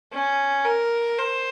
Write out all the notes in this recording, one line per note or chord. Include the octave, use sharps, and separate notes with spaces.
C#4
A#4
C5